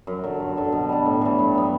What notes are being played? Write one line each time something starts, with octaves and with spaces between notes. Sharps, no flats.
F#2
D3 F#3
G2
D3 F#3
B2
G3 D4
A2
E3 G3
G2
F#3 B3